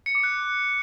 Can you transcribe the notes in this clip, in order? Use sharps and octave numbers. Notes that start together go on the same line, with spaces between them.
C#7
D6
F#6